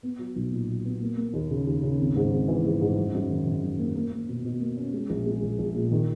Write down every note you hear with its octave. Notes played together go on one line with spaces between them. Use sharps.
B3
F#3
B1
A#2
F#3
B3
A#3
A#3
D#2
C#3
D#2
C#3
G#1
G#2
G#1
E3
G#2
G#2
F#2
F#2
D#3
D#3
F#2
A#3
A#3
A#3
B2
B2
A#3
C#4
G#3
A#1
G#3
A#1
A#1
A#2
D#3